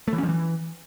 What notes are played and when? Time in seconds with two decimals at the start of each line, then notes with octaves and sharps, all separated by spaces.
0.08 A3
0.13 E3
0.18 C#4
0.23 F3
0.29 E3